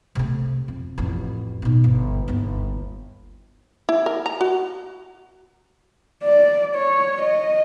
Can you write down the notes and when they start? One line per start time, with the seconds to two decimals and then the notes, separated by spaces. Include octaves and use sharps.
0.15 C3 A3
0.68 F2
0.98 A1 F2
1.62 B2 D#3
1.84 G1
2.28 G1 D#2
3.89 E4
4.06 A#4
4.26 A#5
4.41 F#4
6.23 D5
6.75 C#5
7.22 D#5